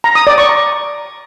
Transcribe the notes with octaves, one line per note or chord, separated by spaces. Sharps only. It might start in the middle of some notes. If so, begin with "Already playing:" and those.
A#5
D#6
D5
C#6
A#5